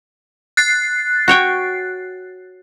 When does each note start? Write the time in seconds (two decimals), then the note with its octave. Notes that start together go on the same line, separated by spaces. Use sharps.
0.57 F#6 A6 C7
1.28 F#4 C#5 G5